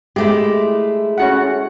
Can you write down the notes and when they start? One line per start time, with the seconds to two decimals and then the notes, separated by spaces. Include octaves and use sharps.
0.16 G#3 A3 E4 G4
1.18 C#4 F#4 F#5